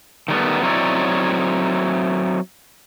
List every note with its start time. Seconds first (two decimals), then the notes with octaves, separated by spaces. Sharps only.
0.28 D#3 G3 A3 B3
0.63 F#3 C4 D#4 E4 C#5 D5